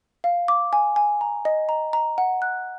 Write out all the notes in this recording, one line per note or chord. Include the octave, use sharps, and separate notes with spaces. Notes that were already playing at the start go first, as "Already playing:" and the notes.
F5
D6
G#5
G#5
A#5
D#5
A#5
A#5
F#5
F#6